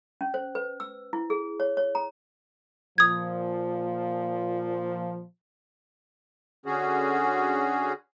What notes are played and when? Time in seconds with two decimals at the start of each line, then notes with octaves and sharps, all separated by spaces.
0.21 C#4
0.34 C5
0.55 B4
0.80 E6
1.13 E4
1.30 G#4
1.60 C#5
1.77 C#5
1.95 A#5
2.98 A#2 F3 D#6 G#6
6.66 D3 C#4 F#4 G#4